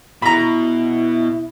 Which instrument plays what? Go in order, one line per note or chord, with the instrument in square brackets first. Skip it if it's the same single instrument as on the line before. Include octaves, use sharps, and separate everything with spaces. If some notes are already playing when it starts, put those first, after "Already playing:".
[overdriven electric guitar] B2 [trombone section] E4 [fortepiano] A#5 B5